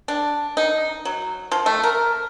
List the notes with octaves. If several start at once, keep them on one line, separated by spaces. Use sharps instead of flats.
D4
D#4
F#3
F3
A3
A#4